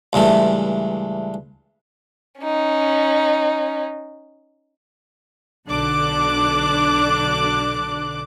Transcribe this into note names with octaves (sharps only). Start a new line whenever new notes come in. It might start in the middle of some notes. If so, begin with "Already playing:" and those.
C#2 G2 E3 A3
C#4 D#4
B1 D3 D4 D6 F#6